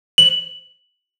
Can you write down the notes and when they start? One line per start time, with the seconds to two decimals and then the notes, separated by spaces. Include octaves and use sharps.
0.18 F#7